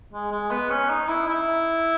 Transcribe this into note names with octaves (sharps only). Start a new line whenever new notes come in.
G#3
G#3
B3
C#4
D#4
E4
E4